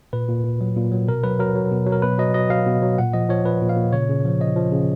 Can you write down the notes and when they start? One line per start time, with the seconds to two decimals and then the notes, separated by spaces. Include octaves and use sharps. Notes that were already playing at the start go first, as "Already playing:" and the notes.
0.13 A#2 B4
0.28 A#2
0.44 A#2
0.61 F#3
0.77 A#2
0.92 F#3
1.08 B2 A#4
1.24 F#3 B4
1.39 F#3 A#4
1.55 F#3
1.71 B2
1.87 F#3
1.92 A#4
2.02 B2 B4
2.18 F#3 D#5
2.34 F#3 D#5
2.50 F#3 F5
2.66 B2
2.82 F#3
2.98 A#2 F#5
3.14 F3 D#5
3.29 F3 C#5
3.45 F3 B4
3.61 A#2
3.69 F5
3.77 A#2
3.93 C#3 C#5
4.09 C#3
4.25 F3
4.40 F3 D#5
4.56 F3
4.72 C#3